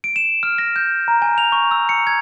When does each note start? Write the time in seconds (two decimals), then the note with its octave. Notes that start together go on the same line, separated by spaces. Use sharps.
0.04 D7
0.16 E7
0.43 F6
0.58 A#6
0.76 G6
1.08 A#5
1.22 G#5
1.38 F7
1.52 C#6
1.71 E6
1.89 C#7
2.07 G#6